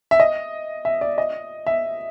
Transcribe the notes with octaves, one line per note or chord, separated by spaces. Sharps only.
E5
D#5
E5
D5
D#5
E5